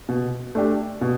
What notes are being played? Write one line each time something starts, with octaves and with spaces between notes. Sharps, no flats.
B2
A3 D4 G4
B2